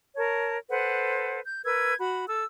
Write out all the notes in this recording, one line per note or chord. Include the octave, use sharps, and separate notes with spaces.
A#4 C#5 A5
A4 B4 C5 F#5
G6
A#4 B4 E6 G#6
F#4 B5
A4 E6